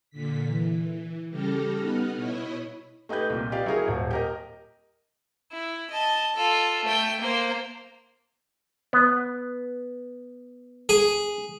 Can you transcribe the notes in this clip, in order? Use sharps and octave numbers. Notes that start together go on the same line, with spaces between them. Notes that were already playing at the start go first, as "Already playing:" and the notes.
A#2 D3 B6
E3
C#3 G3 G4 A4 F6 A#6
B3 D#4 F#5 B5 F6
B2 E4 C#5 D#5 B5
A3 D#4 G4 B4 G6
C2 A#2
G4 B4 D5 D#5 F5
F#3 E4 G#4 A#4
D#1
G4 A#4 D#5
E4
D#5 A5
F4 A4
A3 G5
A#3 C5
B3
G#4